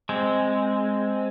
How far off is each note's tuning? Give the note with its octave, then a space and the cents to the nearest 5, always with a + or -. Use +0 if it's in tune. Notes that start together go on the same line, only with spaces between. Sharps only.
G#3 +0 C4 +0